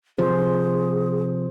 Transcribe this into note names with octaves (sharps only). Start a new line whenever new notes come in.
C3 F3 G#4 C5